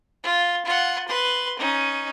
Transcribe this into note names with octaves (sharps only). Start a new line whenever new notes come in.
F4
F4 F#5
B4 C6
C#4 D#4